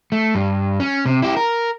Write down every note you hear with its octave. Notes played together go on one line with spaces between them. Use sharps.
A3
G2
C#4
C3
E4 G4
A#4